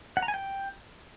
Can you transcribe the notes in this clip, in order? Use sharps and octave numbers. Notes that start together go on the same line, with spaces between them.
F#5
A#5
G#5
G5